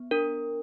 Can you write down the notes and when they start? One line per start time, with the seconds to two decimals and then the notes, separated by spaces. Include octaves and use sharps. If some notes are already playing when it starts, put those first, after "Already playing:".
Already playing: B3
0.11 D4 A#4